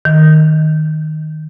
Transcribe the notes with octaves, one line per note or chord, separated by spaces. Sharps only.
D#3